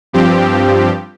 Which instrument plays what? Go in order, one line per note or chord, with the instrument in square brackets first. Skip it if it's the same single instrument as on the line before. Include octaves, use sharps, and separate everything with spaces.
[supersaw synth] G2 F3 C4 G4